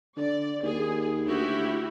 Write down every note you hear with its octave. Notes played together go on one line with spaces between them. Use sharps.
D3 D5
D#2 G#4
D2 E4 F#4 G4